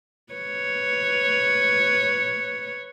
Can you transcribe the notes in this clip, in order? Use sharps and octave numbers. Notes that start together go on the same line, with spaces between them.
B4 C#5